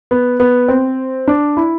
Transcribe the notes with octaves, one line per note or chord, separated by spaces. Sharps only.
B3
B3
C4
D4
E4